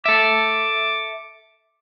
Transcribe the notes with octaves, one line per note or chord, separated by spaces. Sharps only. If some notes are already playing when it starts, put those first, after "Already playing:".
A4 E5 D6